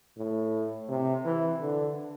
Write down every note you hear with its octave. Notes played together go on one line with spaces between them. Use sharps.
A2
C3
E3
D3